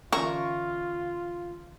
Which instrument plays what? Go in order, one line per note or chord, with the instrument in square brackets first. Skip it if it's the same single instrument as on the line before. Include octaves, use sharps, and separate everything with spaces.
[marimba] D3 E3 C#4 [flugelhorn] F4 [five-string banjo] A#4 [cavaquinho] C#6